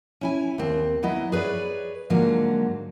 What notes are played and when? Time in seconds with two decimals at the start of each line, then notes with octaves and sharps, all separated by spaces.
0.21 C#4 E4 G#5
0.58 D#2 C4
1.03 F#3 B3 E4 D#5
1.32 G#4 B4 C#5 D5
2.10 G#2 D3 F3 F#3 A#3